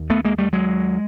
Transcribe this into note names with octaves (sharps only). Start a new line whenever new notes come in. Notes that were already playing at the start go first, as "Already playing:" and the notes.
Already playing: D#2
A3 B3
G#3 A#3
G3 A3
F#3 G#3